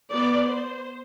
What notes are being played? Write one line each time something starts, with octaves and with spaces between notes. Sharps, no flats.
B3 D5
C5